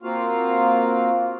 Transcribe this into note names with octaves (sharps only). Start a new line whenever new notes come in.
A#3 C4 F4 F#4 F5